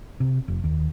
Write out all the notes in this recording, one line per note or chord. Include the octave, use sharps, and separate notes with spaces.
C3
F1
D#2